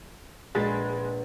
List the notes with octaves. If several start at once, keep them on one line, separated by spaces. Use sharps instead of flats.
A#1 G#3 B4 C5 A6